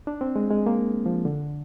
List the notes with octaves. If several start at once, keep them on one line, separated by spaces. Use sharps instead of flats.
D4
C4
G#3
G#3
A#3
F3
D3